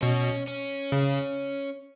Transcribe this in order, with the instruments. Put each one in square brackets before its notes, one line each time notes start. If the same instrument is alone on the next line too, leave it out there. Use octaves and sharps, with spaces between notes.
[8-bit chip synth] B2 [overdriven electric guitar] C#4
[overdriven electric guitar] C#4
[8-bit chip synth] C#3